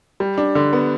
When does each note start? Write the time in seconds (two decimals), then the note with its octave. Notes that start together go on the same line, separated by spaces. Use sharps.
0.20 G3
0.38 D4
0.55 D3
0.73 B3